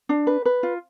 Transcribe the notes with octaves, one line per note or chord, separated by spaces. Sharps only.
D4
B4
B4
F4